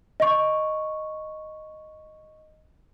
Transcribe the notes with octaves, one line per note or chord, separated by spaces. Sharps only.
D#5 C#6